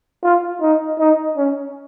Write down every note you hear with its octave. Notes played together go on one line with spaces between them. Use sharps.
F4
D#4
D#4
C#4